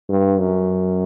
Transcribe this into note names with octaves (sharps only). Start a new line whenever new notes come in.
G2
F#2